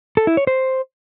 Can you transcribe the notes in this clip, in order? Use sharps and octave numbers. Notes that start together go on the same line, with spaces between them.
A4
E4
C#5
C5